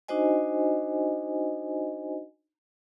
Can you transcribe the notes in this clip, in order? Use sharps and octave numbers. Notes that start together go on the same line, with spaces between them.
D4 D#4 F#4 C5 D#5 G#5